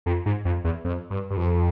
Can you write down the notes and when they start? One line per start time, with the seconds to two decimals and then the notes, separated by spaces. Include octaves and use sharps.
0.06 F2
0.26 G#2
0.45 F2
0.64 E2
0.84 F2
1.10 G2
1.30 G2
1.37 F2